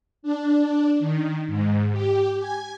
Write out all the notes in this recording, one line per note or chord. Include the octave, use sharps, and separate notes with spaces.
D4
D#3
G#2
G4
G#5